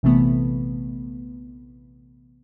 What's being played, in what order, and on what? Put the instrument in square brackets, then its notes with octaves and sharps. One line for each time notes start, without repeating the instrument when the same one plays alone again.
[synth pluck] A#1 C3 E3 A3 B3